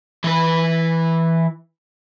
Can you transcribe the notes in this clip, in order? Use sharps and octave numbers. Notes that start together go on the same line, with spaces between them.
E3 B4